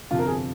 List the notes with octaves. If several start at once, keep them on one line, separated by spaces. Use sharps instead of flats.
G1 F2 C3 F3 F4
A#4
G#4